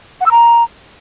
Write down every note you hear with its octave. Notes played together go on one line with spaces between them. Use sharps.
F#5
E6
A#5